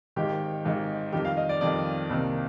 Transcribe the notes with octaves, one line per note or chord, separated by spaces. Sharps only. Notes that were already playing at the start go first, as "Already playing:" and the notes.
G#1 G#2 D#3 G4
G#1 G#2 D#3
F2 D#3 G3 G4
F5
D#5
D5
F2 D#3 G3 D5
C2 C3 D#3 A#3